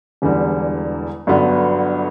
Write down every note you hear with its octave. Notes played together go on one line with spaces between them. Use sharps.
E1 E2 D3 G3
G1 G2 D3 F#3 B3